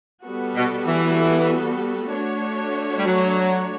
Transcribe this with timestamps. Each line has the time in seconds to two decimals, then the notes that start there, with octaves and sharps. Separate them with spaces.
0.24 G3 B3 F#4 A4
0.56 B2
0.86 E3
2.12 A3 D4 F#4 C#5
2.97 G3
3.06 F#3